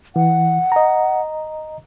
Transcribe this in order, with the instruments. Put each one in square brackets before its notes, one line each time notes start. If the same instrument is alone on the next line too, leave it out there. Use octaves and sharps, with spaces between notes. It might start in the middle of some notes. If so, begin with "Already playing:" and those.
[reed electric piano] E3 [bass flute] F#5
[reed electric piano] D#5 A#5